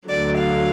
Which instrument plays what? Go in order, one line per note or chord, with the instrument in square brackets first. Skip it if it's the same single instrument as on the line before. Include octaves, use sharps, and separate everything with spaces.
[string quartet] D2 D3 F#3 D5
F5